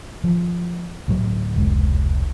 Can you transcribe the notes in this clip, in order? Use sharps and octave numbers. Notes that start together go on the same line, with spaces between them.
F3
D2 A2 F#3
F1 C#2 G#3